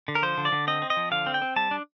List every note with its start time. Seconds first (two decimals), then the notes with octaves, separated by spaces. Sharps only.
0.08 D3
0.15 A#4
0.23 F3 C5
0.38 D3
0.45 D5
0.52 D3
0.67 C4 D#5
0.82 C4
0.90 D#5
0.97 F3
1.11 D3 F5
1.26 C4
1.34 G5
1.42 C4
1.56 G3 A5
1.71 D4